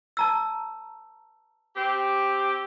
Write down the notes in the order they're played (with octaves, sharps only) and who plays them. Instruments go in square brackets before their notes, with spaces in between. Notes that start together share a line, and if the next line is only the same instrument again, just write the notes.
[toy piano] A5 A#5 E6
[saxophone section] C4 G4